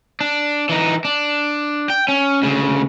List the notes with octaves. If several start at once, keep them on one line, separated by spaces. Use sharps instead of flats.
D4
E3 D#4
D4
G5
C#4
D2 C#3